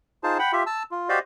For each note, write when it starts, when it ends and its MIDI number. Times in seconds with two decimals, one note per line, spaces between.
0.23 0.38 63
0.23 0.38 65
0.23 0.38 68
0.23 0.38 72
0.23 0.38 81
0.39 0.52 78
0.39 0.52 79
0.39 0.52 83
0.53 0.63 65
0.53 0.63 67
0.53 0.63 76
0.66 0.83 81
0.66 0.83 88
0.91 1.09 65
1.09 1.19 66
1.09 1.19 67
1.09 1.19 72
1.09 1.19 74
1.09 1.19 75
1.09 1.19 77